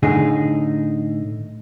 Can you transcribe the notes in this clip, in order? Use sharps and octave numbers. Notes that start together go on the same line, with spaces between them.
A2 D3 D#4 G#4